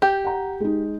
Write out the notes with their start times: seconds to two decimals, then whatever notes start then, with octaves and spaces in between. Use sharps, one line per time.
0.02 G4 G6
0.25 F#5 A#5
0.60 G#3 D#4